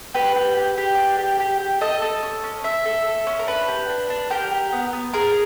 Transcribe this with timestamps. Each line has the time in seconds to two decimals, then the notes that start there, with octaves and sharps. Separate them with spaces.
0.14 G4 B4
0.36 G4
0.56 G4
0.78 G4
0.98 D4
1.19 G4
1.39 G4
1.60 G4
1.81 A4 D#5
2.02 A4
2.23 C#4
2.44 C#4
2.64 C#4 E5
2.85 A4
3.06 A4
3.27 C#4
3.39 A#4
3.47 D4 B4
3.68 G4
3.89 D4
4.10 D4
4.30 G4 A#4
4.51 G4
4.72 B3
4.93 B3
5.13 G#4 A#4